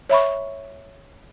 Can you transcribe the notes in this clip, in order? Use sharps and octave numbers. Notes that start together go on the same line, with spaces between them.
C#5 E5 B5 C#6